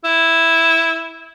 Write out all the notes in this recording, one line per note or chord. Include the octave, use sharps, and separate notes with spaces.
E4